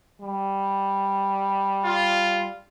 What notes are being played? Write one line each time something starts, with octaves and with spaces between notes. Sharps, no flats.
G3
F4